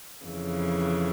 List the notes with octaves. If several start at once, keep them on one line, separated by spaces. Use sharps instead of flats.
F2 C#3 E3